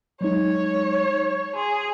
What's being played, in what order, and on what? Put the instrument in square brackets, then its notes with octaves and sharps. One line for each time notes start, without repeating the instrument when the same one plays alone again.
[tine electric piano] F#3 G#3 D#4 [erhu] C#5
[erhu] G#4 [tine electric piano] C6